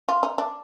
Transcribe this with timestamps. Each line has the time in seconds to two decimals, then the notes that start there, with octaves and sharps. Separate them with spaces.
0.09 F4
0.23 D#4
0.38 D4